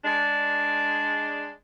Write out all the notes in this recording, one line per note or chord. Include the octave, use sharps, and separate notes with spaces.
G#3 D4